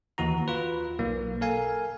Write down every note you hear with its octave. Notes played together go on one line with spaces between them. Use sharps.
D#2 E3 F#4 A#5
F4 B4
B1 A#3
A4 A#4 F5 G#5